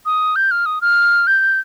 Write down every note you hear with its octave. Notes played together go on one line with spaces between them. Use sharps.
D#6
G6
F6
D#6
F6
G6